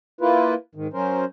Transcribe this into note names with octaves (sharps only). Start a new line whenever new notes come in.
A#3 E4 F4 B4
G#2 D#3
F#3 C#4 A#4 C5